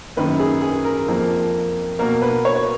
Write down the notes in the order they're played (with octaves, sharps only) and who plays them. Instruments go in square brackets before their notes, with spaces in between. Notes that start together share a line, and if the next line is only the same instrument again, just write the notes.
[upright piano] F#2 D#3 A#3 B4
G#4
G#4
A#4
F2 F3 A#3
B2 A#3 A#4
B4
C#5